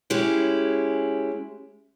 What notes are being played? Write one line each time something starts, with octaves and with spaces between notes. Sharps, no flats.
G#3 C#4 E4 G4